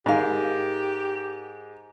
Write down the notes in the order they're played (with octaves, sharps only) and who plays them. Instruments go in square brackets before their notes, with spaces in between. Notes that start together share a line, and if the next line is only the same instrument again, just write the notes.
[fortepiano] G#2 [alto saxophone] G4 [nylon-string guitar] A#4 F5